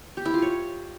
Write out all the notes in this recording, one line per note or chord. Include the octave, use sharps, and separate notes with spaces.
G4
E4
F4
C#5